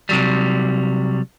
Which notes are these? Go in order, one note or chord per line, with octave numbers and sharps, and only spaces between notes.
C3 F#3 G3